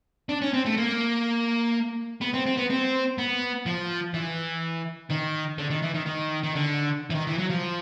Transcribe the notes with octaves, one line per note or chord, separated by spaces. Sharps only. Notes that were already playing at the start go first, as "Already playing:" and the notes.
D4
C#4
C4
A3
A#3
B3
C4
C4
B3
C4
B3
F3
E3
D#3
D3
D#3
E3
D#3
D#3
D#3
D3
E3
D#3
E3
F#3
F3